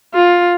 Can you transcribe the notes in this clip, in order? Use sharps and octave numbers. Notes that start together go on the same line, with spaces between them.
F4